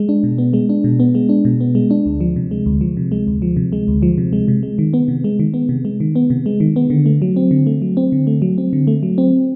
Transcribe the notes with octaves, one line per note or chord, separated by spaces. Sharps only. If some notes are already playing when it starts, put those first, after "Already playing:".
Already playing: G#3
D4
B2
B3
G#3
D4
B2
B3
G#3
D4
B2
B3
G#3
D4
D2
F3
C3
G#3
D2
F3
C3
G#3
D2
F3
C3
G#3
D2
F3
C3
G#3
C3
G#3
D#3
B3
C3
G#3
D#3
B3
C3
G#3
D#3
B3
C3
G#3
D#3
B3
D3
A3
F#3
C4
D3
A3
F#3
C4
D3
A3
F#3
C4
D3
A3
F#3
C4